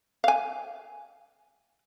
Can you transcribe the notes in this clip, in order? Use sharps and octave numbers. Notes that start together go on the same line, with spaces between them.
F5 G#5